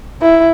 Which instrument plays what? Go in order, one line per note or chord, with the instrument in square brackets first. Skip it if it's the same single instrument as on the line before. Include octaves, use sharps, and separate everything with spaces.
[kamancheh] E4